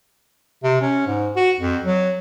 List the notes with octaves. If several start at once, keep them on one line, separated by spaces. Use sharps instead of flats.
C3
C#4
G#2
F#4
F2
F#3